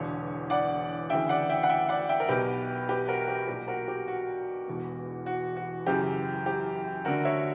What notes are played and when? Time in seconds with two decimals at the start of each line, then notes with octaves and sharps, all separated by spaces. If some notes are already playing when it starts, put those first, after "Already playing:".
Already playing: E1 E2 D3 C#5
0.50 D5 F#5
1.10 D2 C#3 E3 E5 G5
1.29 D5 F#5
1.49 E5 G5
1.63 F#5
1.69 E5 G5
1.89 D5 F#5
2.09 E5 G5
2.20 A#4
2.29 B1 B2 G4 B4
2.89 G4 B4
3.08 F#4 A#4
3.28 G4
3.48 B1 A#2 G4
3.68 F#4 A#4
3.88 G4
4.08 F#4
4.67 E1 E2 B2
5.26 F#4
5.56 F#4
5.86 F#1 F#2 C#3 E3 G4
6.46 G4
7.05 D2 D3 F#4 A#4
7.25 C#5 E5